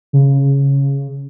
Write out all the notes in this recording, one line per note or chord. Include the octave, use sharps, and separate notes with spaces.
C#3